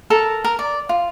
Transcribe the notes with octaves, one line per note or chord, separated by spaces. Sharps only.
A4 A#4 A5 A#5
A#4
D5
F4